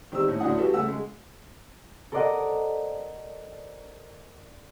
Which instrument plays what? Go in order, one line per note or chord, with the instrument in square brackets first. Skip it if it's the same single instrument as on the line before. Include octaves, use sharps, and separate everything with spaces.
[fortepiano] D#3 G3 C4 E6
A2
D2 A2 D4 F#5 D#6
F#4 G4 A4 B4
C#3 A3 F#5 E6
G#3
[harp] A4 A#4 C5 D5 D#5 F#5